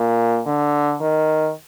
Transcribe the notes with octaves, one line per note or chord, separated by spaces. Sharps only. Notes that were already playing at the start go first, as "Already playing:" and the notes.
Already playing: A#2
D3
D#3